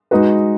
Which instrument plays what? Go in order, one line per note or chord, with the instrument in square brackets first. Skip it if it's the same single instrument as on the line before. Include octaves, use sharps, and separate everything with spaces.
[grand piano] G#3 D#4 F#4 B4